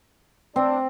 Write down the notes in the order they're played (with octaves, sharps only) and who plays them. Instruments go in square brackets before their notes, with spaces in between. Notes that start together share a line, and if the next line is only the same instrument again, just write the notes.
[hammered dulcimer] C4 [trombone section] D4